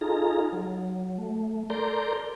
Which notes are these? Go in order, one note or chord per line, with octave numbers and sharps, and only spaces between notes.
D#4 F4 G#4 A4 A#5
F#3
A3
A4 A#4 D5 A#5 C6 G6